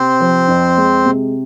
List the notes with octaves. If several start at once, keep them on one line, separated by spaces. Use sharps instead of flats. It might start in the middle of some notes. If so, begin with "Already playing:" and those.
Already playing: C3 C4 C5
F3
F2
G#3
C3